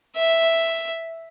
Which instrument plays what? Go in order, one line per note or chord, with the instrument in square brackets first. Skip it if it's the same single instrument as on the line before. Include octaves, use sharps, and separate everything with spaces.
[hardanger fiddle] E5